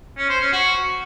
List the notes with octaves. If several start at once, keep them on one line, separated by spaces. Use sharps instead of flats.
C#4
C5
C#4
F#4